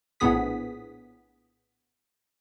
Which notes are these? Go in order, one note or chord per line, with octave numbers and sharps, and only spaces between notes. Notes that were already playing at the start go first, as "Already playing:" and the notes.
A#1 A2 B3 G#4 D#6 B6